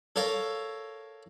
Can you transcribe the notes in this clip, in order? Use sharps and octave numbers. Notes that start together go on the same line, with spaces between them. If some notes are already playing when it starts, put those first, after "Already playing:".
A4 A#4 C#5 F5 A#5